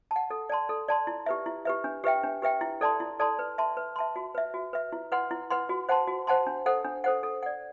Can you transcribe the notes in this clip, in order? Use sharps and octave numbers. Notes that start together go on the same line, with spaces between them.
A5
F#5
A4
D5 A5 C6
A4
D5 A5 C6
E4
G4 B4 E5
E4
G4 B4 E5
D4
G4 B4 E5 G5
D4
G4 B4 E5 G5
E4
A4 D5 A5 C6
E4
A4 D5 A5 C6
B4
E5 A5 C6
B4
E5 A5 C6
F#4
B4 E5
F#4
B4 E5
E4
B4 F#5 C6
E4
B4 F#5 C6
F#4
C5 F#5 A5 C6
F#4
C5 F#5 A5 C6
D4
A4 C5 F#5
D4
A4 C5 F#5
A4
D5 F#5